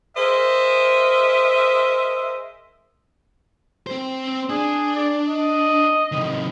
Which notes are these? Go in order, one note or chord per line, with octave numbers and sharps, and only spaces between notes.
G#4 A#4 C5 D#5 E5
C4 C5
D4 G#4
D5
D#5
C3 D#3